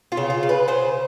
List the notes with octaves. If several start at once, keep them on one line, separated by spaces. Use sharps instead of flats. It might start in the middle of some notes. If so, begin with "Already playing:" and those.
F4
C#3
F4
C#3
B4
C#3 C5